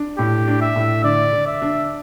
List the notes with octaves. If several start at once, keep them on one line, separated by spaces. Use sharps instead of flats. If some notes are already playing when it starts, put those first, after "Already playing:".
Already playing: D4
A2 G4
D4
E5
A2
D3 D5
D3
E5
D4